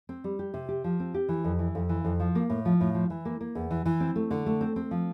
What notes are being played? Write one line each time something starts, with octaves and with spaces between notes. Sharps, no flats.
C4
G3
G4
C3
G4
F3
C4
G4
E3
F2
E3
F2
E3
F2
F3
A#3
A2
F3
A2
F3
E3
A#3
A#3
E2
E3
E3
C4
A3
D3
A3
C4
C4
F3